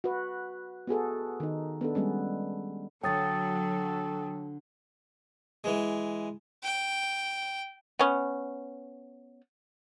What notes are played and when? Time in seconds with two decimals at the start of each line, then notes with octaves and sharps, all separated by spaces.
0.04 F#4 B4
0.87 B3 F#4 G#4 A4
1.40 D#3 D#4
1.81 B3 D4 A4
1.95 G3 G#3 B3 C#4
3.03 D3 F#3 A4 C#5 G5 D#6 A6
5.64 E3 G#3
6.63 G5
7.99 B3 C#4